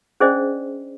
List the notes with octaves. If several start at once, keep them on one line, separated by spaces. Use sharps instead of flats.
C#4 D4 G#4 C5 D5 D#5